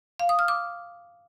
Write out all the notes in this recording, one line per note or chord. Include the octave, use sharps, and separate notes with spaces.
F5
D#6
F6
D6